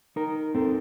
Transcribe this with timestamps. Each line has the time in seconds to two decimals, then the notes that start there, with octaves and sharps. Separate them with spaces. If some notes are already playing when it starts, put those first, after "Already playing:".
0.16 D#4 A#4
0.55 C4 A4